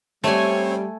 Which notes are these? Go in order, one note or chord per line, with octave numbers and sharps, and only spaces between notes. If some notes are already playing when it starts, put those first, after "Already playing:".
G3 A3 C4 C#5 G#5